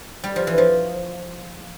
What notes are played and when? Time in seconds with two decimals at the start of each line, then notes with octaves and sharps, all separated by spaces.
0.24 G3
0.36 F3
0.47 E3
0.58 F3